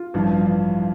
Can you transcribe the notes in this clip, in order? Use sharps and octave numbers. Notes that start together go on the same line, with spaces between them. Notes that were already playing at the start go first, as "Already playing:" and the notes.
Already playing: F4
A1 G2 F3